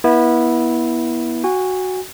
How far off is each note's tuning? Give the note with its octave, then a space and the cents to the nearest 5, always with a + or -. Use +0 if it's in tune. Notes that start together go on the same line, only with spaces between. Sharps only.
B3 -30 E4 -10
F#4 +0 G#5 -30